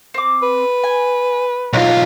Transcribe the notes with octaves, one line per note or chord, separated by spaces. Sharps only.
C4 D6
B4
G#5
B1 F4 F#6